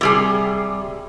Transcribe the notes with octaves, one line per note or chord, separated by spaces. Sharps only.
C3 G3 G#4